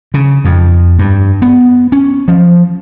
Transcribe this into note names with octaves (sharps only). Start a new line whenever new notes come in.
C#3
F2
G2
B3
C#4
F3